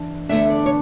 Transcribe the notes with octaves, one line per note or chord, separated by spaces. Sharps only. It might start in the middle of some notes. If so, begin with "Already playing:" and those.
Already playing: E3 D4
E2 D3 A3 D4 E5
D5
C#5